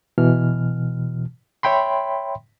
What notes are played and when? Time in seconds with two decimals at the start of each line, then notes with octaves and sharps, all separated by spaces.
0.18 B2 E3 F6
1.63 C#5 E5 G5 B5 C6